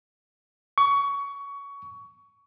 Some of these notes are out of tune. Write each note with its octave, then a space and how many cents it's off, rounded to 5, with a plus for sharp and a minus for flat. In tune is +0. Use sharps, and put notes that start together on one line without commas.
C#6 +20